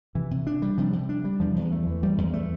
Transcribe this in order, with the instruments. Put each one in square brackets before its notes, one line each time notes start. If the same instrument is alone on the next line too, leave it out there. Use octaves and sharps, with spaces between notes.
[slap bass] C3 [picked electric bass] E3
[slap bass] C3
D4
G3
[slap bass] C3 [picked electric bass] F3
[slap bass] C3
D4
G3
[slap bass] E2 [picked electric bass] F3
[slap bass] E2
A3
E3
[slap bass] E2 [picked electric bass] G3
[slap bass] E2
A3